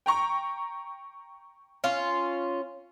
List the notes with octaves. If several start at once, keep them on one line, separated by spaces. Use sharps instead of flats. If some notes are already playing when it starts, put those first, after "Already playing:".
G5 A#5 C#6
C#4 F4